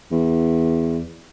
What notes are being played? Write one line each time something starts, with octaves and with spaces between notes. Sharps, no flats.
E2